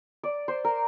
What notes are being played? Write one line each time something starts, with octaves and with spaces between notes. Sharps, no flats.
D5
C5
A#4